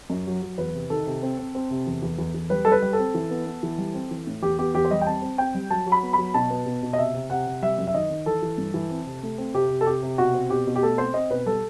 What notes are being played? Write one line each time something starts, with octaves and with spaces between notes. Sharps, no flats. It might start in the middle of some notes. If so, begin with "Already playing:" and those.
F#2
F#3
F#3
E2 B4
C3
D#3 A4
C3
C4
C4
C4
C3
E2
E2
E2
E2
G3 B4
G3 A4
B4
G3
A4
C4
E3
B3
B3
E3
G3
C4
E3
A2
E2 G4
B3 G4
E2 G4
C5
G3 D#5
G5
C4 A5
C4
C4 G5
G3
F#3 A5
F#3
B5
B3
F#3 B5
B2 A5
B3
B2
B2
D#5
C3 E5
C3
C3 F#5
C3
G3 E5
F#2
E5
D#3 D#5
D#3
E3 A4
E3
G2
E3
C4
C3
A3
C4
C3 G4
C3
A4
C3 G4
C3
B2 F#4
C4
B2 G4
B2
G4
A3 A4
C4 C5
C4 D#5
B2 B4
G3 A4